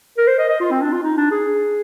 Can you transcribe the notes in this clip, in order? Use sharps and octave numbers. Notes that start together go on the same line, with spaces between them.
A#4
C5
D#5
D#5
F4
C4
D4
F4
D#4
D4
G#4